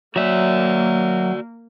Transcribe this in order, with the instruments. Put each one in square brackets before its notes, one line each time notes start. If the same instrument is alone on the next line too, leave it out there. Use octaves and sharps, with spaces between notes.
[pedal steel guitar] F#3 E5 [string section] A#3 [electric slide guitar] F#4 D5